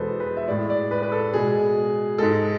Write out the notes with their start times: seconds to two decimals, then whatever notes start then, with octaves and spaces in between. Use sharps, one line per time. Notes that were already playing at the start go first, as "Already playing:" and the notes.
Already playing: E2 B2 G#3 A4 B4 C5
0.20 B4
0.37 E5
0.48 A2 G#3 D5
0.70 D5
0.91 B4
1.02 B4
1.12 A4
1.33 B2 G#3 G#4
2.18 G#2 G#3 A4